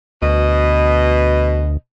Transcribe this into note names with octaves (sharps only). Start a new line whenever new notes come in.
D2 B2 D#5